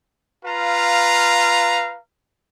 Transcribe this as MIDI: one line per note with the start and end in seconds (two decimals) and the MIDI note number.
0.45 1.99 65
0.45 1.99 71
0.45 1.99 77
0.45 1.99 82